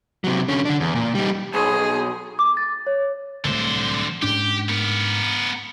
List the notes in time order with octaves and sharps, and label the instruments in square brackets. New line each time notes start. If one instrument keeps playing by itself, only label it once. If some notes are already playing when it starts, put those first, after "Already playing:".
[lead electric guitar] C3 F#3
D3 C#4
D3 D4
E2
A#2
G3 D#4
[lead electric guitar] B1 [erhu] G#4
[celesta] D6
A6
C#5
[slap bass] D1 C2 A3 [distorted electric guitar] D3 C5
[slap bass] G#2 C#4 D4 [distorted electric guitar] G4
[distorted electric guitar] B3 A#4